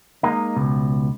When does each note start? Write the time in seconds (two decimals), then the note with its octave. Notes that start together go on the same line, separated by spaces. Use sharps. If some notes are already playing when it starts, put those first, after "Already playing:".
0.23 G#3 A#3 D#4
0.57 C#2 B2